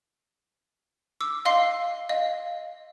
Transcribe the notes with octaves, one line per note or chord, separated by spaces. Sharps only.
D6 E6
D#5 F5 C6 C7
D#5 F5